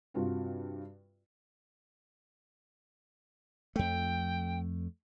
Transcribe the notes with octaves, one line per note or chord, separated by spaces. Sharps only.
G2 C3 F4 F#4
F2 A3 G5